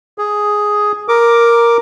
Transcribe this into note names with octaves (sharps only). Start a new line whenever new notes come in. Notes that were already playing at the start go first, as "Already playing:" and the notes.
G#4
A#4 D6